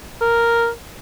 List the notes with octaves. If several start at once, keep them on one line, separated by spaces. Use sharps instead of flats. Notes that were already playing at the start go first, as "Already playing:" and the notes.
A#4